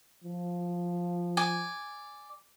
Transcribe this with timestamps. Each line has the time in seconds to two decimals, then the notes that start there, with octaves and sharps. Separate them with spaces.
0.24 F3
1.37 D5 G#5